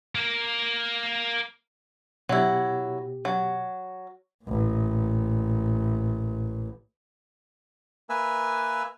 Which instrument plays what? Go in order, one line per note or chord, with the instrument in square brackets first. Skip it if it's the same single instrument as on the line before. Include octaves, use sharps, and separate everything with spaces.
[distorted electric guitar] A#3 A#4
[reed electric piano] B2 G4 [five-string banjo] F#3 E4
[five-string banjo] F#3
[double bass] A1 A#2
[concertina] A#3 B4 E5 G#5 E6